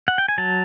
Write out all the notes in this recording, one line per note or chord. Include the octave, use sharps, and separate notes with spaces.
F#5
G5
G#5
F#3 A5